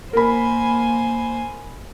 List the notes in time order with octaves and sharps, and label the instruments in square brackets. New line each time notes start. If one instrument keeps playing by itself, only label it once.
[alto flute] A#3 [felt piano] A#4 B5 [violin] C5 G#5